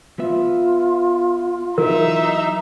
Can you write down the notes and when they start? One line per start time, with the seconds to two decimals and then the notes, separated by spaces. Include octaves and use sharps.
0.19 B3 F4 B4 E5
1.78 E3 F#3 D#4 E4 A#4 E5